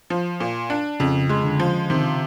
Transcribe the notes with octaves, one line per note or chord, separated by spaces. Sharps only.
F3
A#2
D4
F2 C#3
G#3
D3
F3
C3 D#3